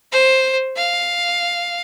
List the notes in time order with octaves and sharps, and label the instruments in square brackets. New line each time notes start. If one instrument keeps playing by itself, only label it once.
[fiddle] C5
F5